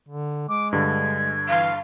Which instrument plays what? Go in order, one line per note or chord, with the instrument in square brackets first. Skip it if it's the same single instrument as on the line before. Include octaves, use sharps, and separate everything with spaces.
[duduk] D3
[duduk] G#3 [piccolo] D6
[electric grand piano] G2 D3 [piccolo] G#6
[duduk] E3 [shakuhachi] F5